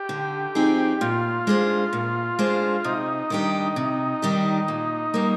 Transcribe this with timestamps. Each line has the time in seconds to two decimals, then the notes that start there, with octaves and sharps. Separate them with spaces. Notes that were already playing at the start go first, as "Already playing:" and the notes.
Already playing: G4
0.09 D3
0.55 F3 C4 D#4 G#4
1.01 A#2 F4
1.47 G#3 D4 G#4 C5
1.93 A#2
2.39 G#3 D4 G#4 C5
2.84 C3 D#4
3.30 D#3 G3 D4 G4
3.76 C3
4.22 D#3 G3 D4 G4
4.68 A#2
5.14 G3 A#3